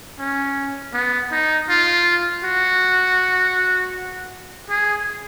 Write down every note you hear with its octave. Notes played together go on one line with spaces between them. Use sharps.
C#4
B3
D#4
F4
F#4
G#4